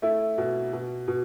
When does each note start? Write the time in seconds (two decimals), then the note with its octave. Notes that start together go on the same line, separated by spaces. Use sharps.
0.02 A3 E4
0.38 B2
0.73 B2
1.08 B2